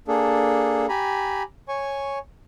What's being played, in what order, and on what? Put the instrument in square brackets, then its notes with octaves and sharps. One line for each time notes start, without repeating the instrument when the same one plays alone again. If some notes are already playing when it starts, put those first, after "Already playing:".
[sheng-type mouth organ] A#3 D4 G#4 A4
G4 G#5 A#5 B5
C#5 G#5 C#6